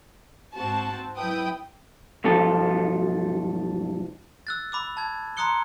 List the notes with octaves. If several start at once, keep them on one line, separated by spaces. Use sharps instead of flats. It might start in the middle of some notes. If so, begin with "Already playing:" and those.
G#2 C4 F#4 A5
F#3 E4 B4 G5 D#6
B1 G2 F3 A4
E6 F#6 A6
B5 D6 E6
A5 G#6
A#5 C6 D#6 F#6 C#7 G7